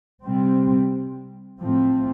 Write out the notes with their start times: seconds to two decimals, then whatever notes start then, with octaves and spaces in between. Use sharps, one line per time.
0.23 C3 G3 C4
1.62 A2 F3 A3 C4